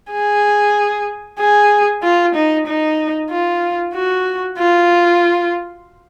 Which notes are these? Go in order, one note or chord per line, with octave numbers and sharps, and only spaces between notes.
G#4
G#4
F4
D#4
D#4
F4
F#4
F4